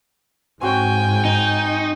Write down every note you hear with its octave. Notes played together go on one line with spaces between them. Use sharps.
G#2 C4 F#4 C#5 G5 G#5
D#4